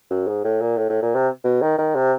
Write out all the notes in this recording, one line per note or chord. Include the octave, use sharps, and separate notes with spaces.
F#2
G#2
A2
A#2
A2
A2
A#2
C3
B2
D#3
D#3
C3